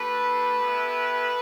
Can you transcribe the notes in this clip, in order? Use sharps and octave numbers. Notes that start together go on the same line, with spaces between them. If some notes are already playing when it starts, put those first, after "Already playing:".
Already playing: A3 D4 G4 A4 B4
B3 E4 G4